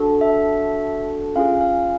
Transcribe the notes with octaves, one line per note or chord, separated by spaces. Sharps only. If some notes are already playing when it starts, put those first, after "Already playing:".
Already playing: D4 F#4 A4
E5
C#4 F4 G#4 F5
F5